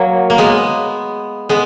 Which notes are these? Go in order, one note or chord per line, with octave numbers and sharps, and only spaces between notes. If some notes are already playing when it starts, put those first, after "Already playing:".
Already playing: F#3 A#3
A#3
G#3 B3
G#3 B3